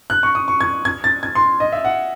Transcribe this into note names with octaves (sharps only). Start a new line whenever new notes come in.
F#6
C#6
D#6
C#6
G#6
G#6
A6
G#6
C6
D#5
E5
F#5